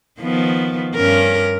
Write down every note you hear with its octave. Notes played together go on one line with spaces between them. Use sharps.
D#3 F3 B3
G2 C#4 A#4